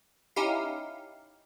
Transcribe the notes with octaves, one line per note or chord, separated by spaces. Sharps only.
C#4 D#4 E4 G4 F5